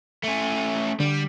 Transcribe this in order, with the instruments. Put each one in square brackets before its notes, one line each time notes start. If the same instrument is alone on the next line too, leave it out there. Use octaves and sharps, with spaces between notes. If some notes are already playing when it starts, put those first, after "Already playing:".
[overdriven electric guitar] A3 C#4
[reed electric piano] D3 [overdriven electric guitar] G3